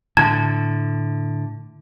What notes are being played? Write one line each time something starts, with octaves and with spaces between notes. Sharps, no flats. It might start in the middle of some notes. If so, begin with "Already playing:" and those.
A2 D3 A5 G#6